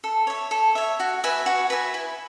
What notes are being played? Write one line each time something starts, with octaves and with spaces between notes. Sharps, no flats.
A4
C#5 E5
A4
C#5 E5
F#4
B4 E5 G#5
F#4
B4 E5 G#5
E4